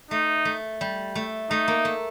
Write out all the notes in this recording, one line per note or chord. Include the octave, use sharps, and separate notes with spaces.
A3 D#4
A3
G3
A3
A3 D#4
A#3
A3